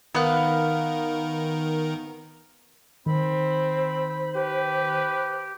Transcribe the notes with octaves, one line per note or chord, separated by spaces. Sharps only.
D#3 B3 A#4 F5 F#6
D#3 C4 C5 B5
G4 B4